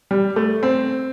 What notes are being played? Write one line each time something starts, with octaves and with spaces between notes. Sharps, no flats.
G3
A3
C4